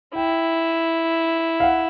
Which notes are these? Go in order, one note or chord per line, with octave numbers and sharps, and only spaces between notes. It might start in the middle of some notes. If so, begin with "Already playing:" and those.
E4 G5
F5
F#5